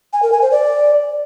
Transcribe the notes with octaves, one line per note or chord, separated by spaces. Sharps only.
G#5
A#4
G#5
C5
D5